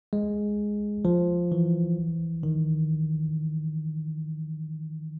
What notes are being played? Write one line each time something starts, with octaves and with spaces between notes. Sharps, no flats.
G#3
F3
E3
D#3